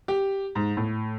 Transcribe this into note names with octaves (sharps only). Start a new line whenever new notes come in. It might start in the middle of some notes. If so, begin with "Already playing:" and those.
G4
G#2
A2